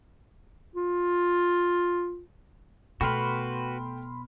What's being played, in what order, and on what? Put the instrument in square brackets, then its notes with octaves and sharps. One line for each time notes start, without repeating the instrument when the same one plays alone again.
[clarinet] F4
[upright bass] B2 [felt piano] A3 G5 F6 [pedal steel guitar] F#4 B4 [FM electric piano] B5 C6